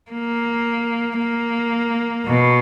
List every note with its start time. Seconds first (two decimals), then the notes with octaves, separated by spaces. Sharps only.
0.11 A#3
1.19 A#3
2.26 B2